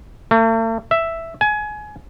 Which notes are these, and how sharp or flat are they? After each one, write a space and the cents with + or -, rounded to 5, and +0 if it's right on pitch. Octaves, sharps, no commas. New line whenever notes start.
A3 +45
E5 +5
G#5 +25